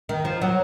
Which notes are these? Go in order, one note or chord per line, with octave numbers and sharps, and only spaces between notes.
D#3
F3
F#3